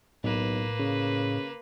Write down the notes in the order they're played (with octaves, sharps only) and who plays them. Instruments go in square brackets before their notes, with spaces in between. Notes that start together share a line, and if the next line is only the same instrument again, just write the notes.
[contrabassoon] B1 [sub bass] A2 [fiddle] A#3 B4
[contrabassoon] C#3